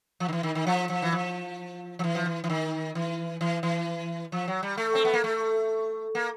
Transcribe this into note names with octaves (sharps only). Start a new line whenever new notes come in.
F3
D#3
E3
D#3
D#3
F3
F3
E3
F3
F3
E3
F3
E3
E3
D#3
E3
E3
E3
F3
F#3
G3
A3
C4
B3
A#3
A3
A#3